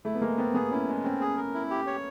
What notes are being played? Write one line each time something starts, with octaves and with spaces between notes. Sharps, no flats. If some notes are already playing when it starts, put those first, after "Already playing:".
A3 E4
B3
G#3 A#3
B3 C4
B3 G#4
C#4 E4
G#3
C4 C#4
G#4
A#4
E4
G4
C#5